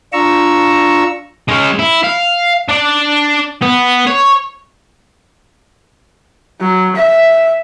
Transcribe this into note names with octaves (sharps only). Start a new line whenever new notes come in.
D4 F4 A#5 C#6 E6
G#3 C#4
E4
F5
D4 D5
B3
C#5
F#3
E5